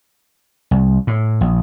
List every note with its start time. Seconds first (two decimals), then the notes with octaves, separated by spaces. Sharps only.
0.71 C2
1.07 A2
1.41 A#1